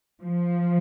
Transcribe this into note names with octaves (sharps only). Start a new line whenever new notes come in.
F3